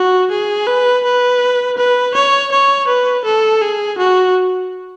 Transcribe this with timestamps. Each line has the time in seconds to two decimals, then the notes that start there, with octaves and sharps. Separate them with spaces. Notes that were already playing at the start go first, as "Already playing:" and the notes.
Already playing: F#4
0.31 G#4
0.67 B4
1.05 B4
1.78 B4
2.14 C#5
2.52 C#5
2.87 B4
3.25 A4
3.61 G#4
3.98 F#4